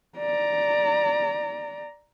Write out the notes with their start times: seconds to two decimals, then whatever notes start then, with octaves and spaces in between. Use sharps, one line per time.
0.18 D5 A#5